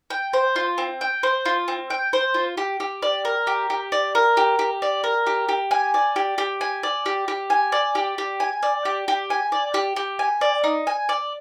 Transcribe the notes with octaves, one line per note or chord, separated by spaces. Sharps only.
G5
C5
F4
C4
G5
C5
F4
C4
G5
C5
F4
G4
G4
D5
A#4
G4
G4
D5
A#4
G4
G4
D5
A#4
G4
G4
G#5
D5
G4
G4
G#5
D5
G4
G4
G#5
D5
G4
G4
G#5
D5
G4
G4
G#5
D5
G4
G4
G#5
D5
D#4
G#5
D5